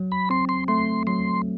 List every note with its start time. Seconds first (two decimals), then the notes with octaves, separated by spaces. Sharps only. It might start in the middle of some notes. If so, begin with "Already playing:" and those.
Already playing: F#3
0.12 B5
0.30 C4 C6
0.49 C6
0.68 A3 C6
1.07 F#3 C6